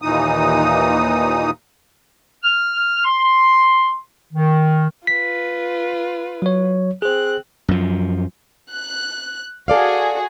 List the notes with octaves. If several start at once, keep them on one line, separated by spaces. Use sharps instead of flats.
D#2 A#2 E3 D#4 D#6
F6
C6
D#3
F4 B4 B6
F#3 C#5
C4 G#4 C5 F#6
F#2 F3
F#6
F#4 G#4 A4 D5 F5